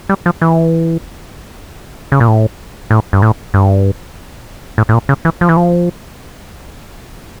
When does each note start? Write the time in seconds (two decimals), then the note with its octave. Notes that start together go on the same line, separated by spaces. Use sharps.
0.09 G3
0.26 F3
0.42 E3
2.12 C#3
2.20 A#2
2.28 A2
2.91 A2
3.13 G2
3.22 A2
3.54 G2
4.78 A2
4.89 A2
4.94 A#2
5.09 C#3
5.25 E3
5.41 F3
5.49 E3
5.57 F3